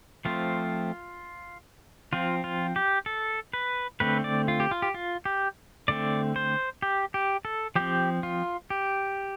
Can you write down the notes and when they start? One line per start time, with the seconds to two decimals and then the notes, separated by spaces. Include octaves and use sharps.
0.25 F3 A3 C4 F4
2.13 F3 C4 F4
2.44 F4
2.76 G4
3.06 A4
3.53 B4
4.00 D3 A3 C4 B4
4.24 D5
4.48 F4
4.60 G4
4.71 F4
4.82 G4
4.94 F4
5.25 G4
5.88 D3 A3 C4 D5
6.36 C5
6.82 G4
7.14 G4
7.45 A4
7.76 F3 C4 G4
8.23 F4
8.70 G4